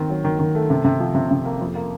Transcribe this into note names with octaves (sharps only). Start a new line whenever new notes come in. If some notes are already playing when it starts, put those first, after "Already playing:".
Already playing: D#3 C4
F#3
D#3
D#3
A3
C3
C3
F3
C3
C3
A#3
F2
A#3